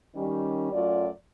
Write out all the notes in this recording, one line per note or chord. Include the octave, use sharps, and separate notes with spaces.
D#3 G3 C#4
F#2 F#3 A3 F4 D5